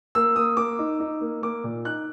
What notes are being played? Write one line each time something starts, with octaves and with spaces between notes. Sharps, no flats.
A#3 E6
A#3 D#6
A#3 D6
D#4
D#4
A#3
A#3 D6
A#2
D#4 F#6